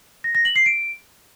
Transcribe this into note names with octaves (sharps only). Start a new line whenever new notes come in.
A#6
A#6
F#7
C7
D7